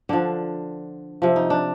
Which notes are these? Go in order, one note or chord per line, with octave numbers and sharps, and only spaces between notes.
D3 F3 D4
C3 F3
D#4
D4